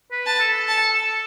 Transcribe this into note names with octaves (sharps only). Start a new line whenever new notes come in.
B4
A5
A4
A5